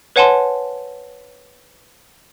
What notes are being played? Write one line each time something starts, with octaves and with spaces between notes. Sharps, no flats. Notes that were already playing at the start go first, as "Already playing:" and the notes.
B4 C#5 F#5 G#5 A5 C6